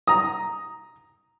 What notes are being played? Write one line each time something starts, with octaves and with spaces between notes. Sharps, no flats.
A#5 D#6